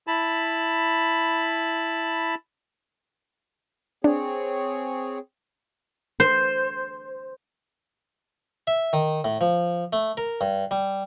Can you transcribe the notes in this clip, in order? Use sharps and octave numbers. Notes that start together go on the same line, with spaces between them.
E4 A5 B5
C4 D4 G#4 C#5
C5
E5
D#3
A2
F3
A3
A#4
G2
G3